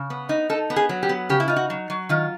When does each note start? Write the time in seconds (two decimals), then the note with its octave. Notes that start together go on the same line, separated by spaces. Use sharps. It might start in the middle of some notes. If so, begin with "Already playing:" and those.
Already playing: C#3
0.10 B3
0.29 D#4
0.50 D#4 A4
0.70 B3
0.76 G#4
0.89 F#3
1.03 G4
1.09 B3
1.29 C#3 G4
1.40 E4
1.48 D#4 F4
1.56 F#4
1.70 F#3
1.90 F#3
2.09 D#3 F4